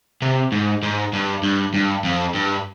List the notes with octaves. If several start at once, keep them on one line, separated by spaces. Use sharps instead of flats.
C3
G#2
G#2
G2
G2
G2
F2
G2